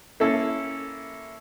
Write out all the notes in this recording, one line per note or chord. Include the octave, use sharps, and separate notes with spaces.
A#3 C#4 E4 A4